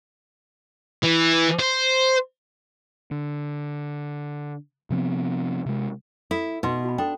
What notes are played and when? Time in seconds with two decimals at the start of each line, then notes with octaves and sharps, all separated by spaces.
1.03 E3
1.60 C5
3.11 D3
4.90 C3 F3 B3 C4
5.66 C3 G#3
6.31 E4 A4
6.63 B2 D#4 B4 C6
6.84 F#4 B5
6.98 D4 A4 G5